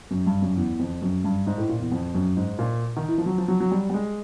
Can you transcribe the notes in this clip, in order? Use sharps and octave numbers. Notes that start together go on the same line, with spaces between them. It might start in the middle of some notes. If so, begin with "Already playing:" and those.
F#2
G2
F#2
E2
F2
F#2
G2
G#2
A2
A#2
E2
F2
F#2
G#2
A#2
D#3
E3
F3
F#3
F3
F#3
F#3
G3
G3
G#3